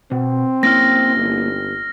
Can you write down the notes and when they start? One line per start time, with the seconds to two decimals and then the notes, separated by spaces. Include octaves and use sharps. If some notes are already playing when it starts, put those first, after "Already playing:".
0.11 B2 C4
0.63 A#3 C#4 E4 F6 A#6
1.17 G1